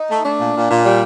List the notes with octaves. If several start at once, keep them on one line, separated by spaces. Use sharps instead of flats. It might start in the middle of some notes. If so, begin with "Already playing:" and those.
Already playing: D#4
A3
A3 D4
A#2
A#2
A#2
G3